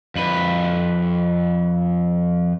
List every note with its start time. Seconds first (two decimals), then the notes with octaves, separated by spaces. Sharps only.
0.16 F2 B4